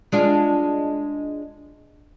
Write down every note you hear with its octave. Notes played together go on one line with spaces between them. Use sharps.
G#3 D4 F4